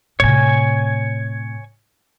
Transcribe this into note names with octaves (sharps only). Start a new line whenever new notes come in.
A2 C3 C#5 G#5